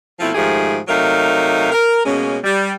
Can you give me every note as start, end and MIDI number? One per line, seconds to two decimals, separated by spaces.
0.20 0.30 47
0.20 0.30 53
0.20 0.30 57
0.20 0.30 60
0.20 0.30 64
0.20 0.30 65
0.35 0.78 44
0.35 0.78 51
0.35 0.78 53
0.35 0.78 57
0.35 0.78 67
0.35 0.78 68
0.88 1.71 48
0.88 1.71 54
0.88 1.71 57
0.88 1.71 63
0.88 1.71 70
0.88 1.71 77
1.72 2.00 70
2.04 2.37 47
2.04 2.37 56
2.04 2.37 58
2.04 2.37 61
2.44 2.71 55